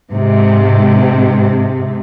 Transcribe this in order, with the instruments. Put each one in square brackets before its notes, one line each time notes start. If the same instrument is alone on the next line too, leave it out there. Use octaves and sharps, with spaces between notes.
[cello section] G#2 C3